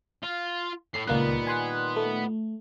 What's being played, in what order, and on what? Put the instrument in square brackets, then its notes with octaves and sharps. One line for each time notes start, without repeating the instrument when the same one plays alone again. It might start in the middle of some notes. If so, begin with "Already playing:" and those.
[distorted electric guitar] F4
[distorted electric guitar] A2 [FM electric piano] C7
[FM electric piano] C#2 A#3 F#6 [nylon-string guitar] A#2 D#3 G3 [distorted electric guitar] B3
[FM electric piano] G#5 C6 F#6
A3